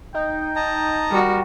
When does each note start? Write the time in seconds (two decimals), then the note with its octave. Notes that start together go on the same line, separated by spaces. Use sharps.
0.14 D#4 G5
0.56 D#5 A5 A#5
1.11 G3 F#4 A#4